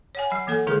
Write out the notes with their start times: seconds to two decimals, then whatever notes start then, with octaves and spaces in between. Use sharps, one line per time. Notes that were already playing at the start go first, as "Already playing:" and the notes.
0.15 C#5 F#5 G#5
0.30 F#3 F#5 B5
0.47 E3 A#3 A4 F#5
0.67 D3 D#3 G#3 E4 G#4 A#4